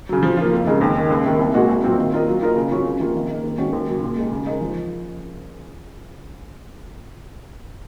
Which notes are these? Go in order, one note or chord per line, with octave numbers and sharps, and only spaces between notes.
C#3 F#3
F3
A#3 F4
F2
C#3 G#3 D#4 A#4
D#2
D#3 A#3
C#2
C3 D#3 A#3
C2
A#2 G#3 D#4 F#4
C2
A#2 F#3 C4 F4
D#3
A#3 F4 A#4 D#5
F#3
A#3 F4 A#4 D#5
C#3
F#3 C#4 F4
C#2
C3 F3 A#3 F4
D#3
A#3 D#4
D#2
D#3 G#3 C#4 F#4
D#2
C#3 F#3
A#2
G#3 D#4
C#3
G#3 D#4 A#4
F3